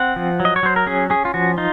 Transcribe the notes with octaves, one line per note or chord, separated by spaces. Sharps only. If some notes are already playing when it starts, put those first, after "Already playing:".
Already playing: C4 F#5
F3
F#3
D#5
C#5
F#3 C5
A#4
C#4 G#4
C#4 G#4
F4
F3 F#4
D#4 F4